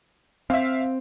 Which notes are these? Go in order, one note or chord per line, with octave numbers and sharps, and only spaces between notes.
C4 E5 F5